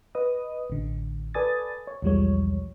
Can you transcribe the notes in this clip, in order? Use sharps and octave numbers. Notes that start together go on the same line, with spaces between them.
B4 D#5 D#6
A1 D3
A4 B4 D5 G#5 D#6 A6
C#5
B1 E2 F3 G3 G#3 C#5